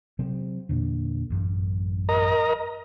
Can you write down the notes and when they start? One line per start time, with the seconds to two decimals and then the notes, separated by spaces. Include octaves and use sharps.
0.19 C3 F#3 C4
0.69 E2 A#2 D3
1.30 A1 F#2
2.09 A#4 D#5 A#5